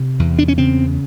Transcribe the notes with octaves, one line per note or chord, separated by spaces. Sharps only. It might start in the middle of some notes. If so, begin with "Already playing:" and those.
Already playing: C3
E2
D4
C#4
C#3 C4